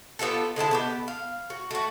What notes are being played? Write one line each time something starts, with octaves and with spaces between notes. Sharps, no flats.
B3 F4 G4 A4
D3 G#3 E4 A5
B3 F#4 G4
F5
F#4
A3 F#4